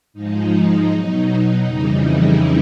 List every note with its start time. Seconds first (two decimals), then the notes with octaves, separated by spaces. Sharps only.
0.13 G#2 F3 G#3 D#4
0.51 D#4
0.88 B2 F#3 D#4
1.63 F2 C#3 E3 G3 D#4
2.01 E4